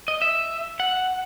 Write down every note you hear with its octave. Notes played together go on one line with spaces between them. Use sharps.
D#5
E5
F#5